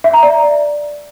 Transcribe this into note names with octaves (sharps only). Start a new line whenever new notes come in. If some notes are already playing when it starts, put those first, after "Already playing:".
E5
A#5
D5